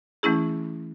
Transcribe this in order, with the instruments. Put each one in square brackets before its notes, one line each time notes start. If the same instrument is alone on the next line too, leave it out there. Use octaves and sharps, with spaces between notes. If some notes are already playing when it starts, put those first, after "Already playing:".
[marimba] E3 A3 C#4 E4 G#4